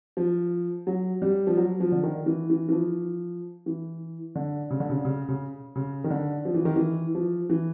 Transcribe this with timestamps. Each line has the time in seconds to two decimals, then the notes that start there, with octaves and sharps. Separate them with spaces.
0.17 F3
0.87 F#3
1.22 G3
1.47 F3
1.57 F#3
1.80 F3
1.92 D3
2.04 D#3
2.26 E3
2.50 E3
2.69 E3
2.72 F3
3.66 E3
4.35 D3
4.70 C#3
4.80 D3
4.90 C#3
5.05 C#3
5.28 C#3
5.76 C#3
6.04 D#3
6.10 D3
6.45 F3
6.55 E3
6.65 D#3
6.76 E3
7.15 F3
7.50 E3